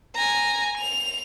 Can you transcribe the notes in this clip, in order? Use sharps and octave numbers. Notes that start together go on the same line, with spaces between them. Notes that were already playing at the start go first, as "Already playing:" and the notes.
G#5 A#5
F7